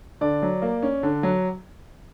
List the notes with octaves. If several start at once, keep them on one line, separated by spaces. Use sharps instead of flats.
D3 D5
F#3
A#3
C#4
D3
F#3